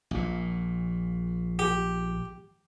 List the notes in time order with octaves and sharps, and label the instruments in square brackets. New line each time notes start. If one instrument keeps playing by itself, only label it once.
[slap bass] A#1 A#2
[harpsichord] G4